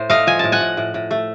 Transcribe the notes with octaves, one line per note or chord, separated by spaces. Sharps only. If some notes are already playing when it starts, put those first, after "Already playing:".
Already playing: A2 C5
A3 D#5 F5
F3 G#5
A2 A5
F#5 G#5
A2
A2
A2
A3